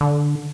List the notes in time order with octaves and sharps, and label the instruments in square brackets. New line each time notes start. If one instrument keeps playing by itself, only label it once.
[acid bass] D3